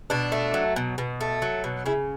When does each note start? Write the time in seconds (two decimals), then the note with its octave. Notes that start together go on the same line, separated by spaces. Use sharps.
0.10 B2 D4
0.32 A3
0.54 F#3
0.76 B2
0.98 B2
1.21 A3
1.42 F#3
1.64 B2
1.86 C#3 E4